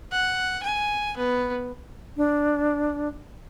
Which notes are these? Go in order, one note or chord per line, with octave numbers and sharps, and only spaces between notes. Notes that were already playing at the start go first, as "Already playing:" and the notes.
F#5
G#5
B3
D4